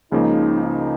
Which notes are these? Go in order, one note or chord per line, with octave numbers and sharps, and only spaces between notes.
C#2 C#3 F3 A#3 D#4
D#4